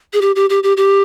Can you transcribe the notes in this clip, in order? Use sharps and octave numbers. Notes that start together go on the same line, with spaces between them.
G#4
G4
G4
G4
G4
G4